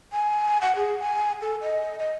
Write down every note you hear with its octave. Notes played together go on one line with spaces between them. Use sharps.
G#5
F#5
G#4
G#5
A4
D#5
D#5